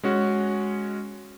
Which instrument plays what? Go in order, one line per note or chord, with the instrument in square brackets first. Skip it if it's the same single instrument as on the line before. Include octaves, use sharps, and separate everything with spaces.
[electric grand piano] G#3 C#4 F#4